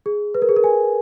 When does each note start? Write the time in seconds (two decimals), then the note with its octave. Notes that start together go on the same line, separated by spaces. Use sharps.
0.06 G#4
0.35 B4
0.42 A#4
0.49 G#4
0.56 A#4
0.64 G#5